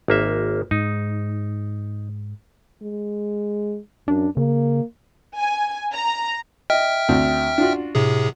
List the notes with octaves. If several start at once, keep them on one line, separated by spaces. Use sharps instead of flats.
G#1 A#3 E5
G#2 D#4
G#3
F#2 D4
C#3 A#3
G#5
A#5
D#5 E5 G5 F6
D2 C4
D4 F4 F#4
A2 C3 G#4